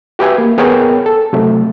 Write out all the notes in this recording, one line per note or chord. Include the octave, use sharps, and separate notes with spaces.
F#4 G4 B4 E5 G#5
A#3
B3 G#4 A#4 C#5 G5 G#5
A4
C3 F#3 A3